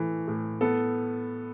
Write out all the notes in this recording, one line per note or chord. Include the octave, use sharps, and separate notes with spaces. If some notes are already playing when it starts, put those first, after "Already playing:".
Already playing: A2 E3 A3
A2
B3 A4